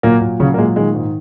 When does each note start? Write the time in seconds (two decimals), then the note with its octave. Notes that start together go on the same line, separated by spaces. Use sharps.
0.03 A#2 F#3 A#3
0.21 A#2
0.40 C#3 F#3 C#4
0.54 A#3
0.58 A#2 G#3
0.76 D#3 G#3
0.95 G#2